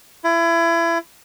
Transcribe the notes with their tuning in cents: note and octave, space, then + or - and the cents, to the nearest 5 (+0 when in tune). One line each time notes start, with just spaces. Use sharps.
E4 +30